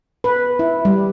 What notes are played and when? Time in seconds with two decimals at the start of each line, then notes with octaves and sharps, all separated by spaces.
0.24 B4
0.59 E4
0.85 G3